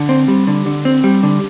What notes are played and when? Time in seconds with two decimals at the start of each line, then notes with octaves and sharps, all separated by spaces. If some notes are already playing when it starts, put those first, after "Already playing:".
Already playing: D3
0.09 C4
0.28 G3
0.47 D3
0.66 D3
0.85 C4
1.04 G3
1.23 D3